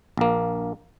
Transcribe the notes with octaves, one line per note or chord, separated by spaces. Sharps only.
A#1 A#3